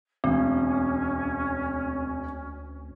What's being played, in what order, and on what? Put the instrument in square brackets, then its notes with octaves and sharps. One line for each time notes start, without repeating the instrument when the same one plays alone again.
[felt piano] E1 [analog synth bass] D2 [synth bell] C4 [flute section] C#4